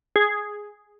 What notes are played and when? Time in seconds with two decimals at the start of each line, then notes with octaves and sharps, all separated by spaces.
0.16 G#4